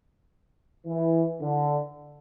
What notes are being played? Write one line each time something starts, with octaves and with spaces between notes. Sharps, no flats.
E3
D3